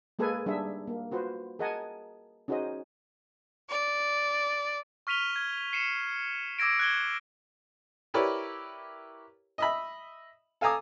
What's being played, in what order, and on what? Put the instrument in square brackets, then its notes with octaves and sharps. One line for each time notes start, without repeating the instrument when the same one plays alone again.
[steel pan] G#3 A#3 G#4 A4 B4 G#5
G3 D4 D#4 G#4 E5
A#3
F4 F#4 B4 C5
G#4 A#4 D#5 F#5 G#5 A5
C#4 D#4 F#4 G#4 C5 D#5
[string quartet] D5
[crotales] C#6 F6 B6 D#7 F7 G7
G#6
C7 C#7 D#7 E7
D6 E6 G#6 A#6 D7
F#6 G#6 G7
[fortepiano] E4 G4 A#4 B4 C#5 D5
D#5 E5 B5
A4 F5 G#5 A#5 D6 D#6